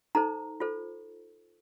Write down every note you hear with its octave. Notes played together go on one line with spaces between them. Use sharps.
D#4 A4 C5 A#5
F4 A4 C5